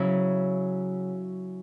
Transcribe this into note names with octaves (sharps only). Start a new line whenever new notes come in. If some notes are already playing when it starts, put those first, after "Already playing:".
Already playing: C#3 F#3 C#4 E4